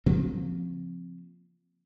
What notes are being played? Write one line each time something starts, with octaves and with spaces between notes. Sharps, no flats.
C#3 F3 A#3 C4